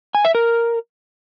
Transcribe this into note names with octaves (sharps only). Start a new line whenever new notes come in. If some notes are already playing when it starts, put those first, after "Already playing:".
G#5
E5
A#4